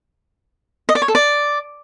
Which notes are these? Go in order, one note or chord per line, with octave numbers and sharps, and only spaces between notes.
D#5
D5
C#5
A4
D5